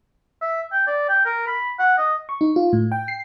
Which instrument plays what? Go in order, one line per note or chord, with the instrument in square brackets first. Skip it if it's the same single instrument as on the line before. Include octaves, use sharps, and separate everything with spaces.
[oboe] E5
G5
D5
G5
A#4
B5
F#5
D#5
[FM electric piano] C#6
D#4
F4
A2
G5
C7